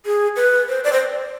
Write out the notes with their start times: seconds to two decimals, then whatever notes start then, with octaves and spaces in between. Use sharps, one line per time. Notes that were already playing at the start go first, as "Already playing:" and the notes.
0.06 G#4
0.36 B4
0.69 C5
0.84 D5
0.93 C5